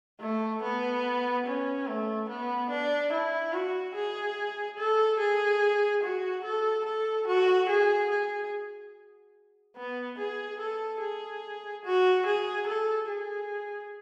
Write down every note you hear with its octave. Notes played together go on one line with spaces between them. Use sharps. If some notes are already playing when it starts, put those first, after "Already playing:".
A3
B3
C#4
A3
B3
D4
E4
F#4
G#4
A4
G#4
F#4
A4
A4
F#4
G#4
G#4
B3
G#4
A4
G#4
F#4
G#4
A4
G#4